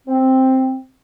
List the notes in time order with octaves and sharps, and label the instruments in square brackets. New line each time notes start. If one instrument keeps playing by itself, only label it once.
[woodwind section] C4